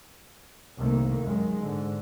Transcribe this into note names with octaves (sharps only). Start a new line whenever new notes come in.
C2 C3 D#3 A3 A#3
F#2 D#3 G#3
G#2 D3